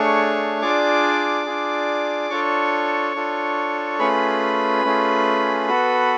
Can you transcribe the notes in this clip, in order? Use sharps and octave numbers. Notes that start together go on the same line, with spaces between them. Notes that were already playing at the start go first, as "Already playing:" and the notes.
Already playing: A3 D4 G#4 C#5 C#6
D4 F4 G#4 D5 D6
D4 F4 G#4
D4 F4 A4 C#5 C#6
D4 F4 A4
A3 C#4 F4 G#4 B4 B5
A3 C#4 F4 G#4
B3 F#4 A4